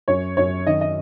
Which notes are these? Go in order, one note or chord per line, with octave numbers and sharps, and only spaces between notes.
F#2 C#5
F#2 C#5
D#3 D#5
D#5